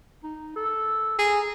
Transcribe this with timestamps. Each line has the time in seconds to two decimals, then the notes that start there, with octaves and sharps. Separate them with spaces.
0.24 D#4
0.56 A4
1.19 G#4 A#5